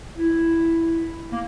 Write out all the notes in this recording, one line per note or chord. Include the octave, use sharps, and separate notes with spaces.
E4
A#3